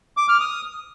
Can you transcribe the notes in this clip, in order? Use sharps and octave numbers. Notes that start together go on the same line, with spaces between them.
D6
F6
D#6